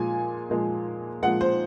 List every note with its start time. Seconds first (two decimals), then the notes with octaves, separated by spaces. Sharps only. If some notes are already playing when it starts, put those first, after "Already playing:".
Already playing: A#2 F3 G#3 G#5
0.50 A#2 F3 G#3
1.23 A#2 F3 G#3 F#5
1.41 C5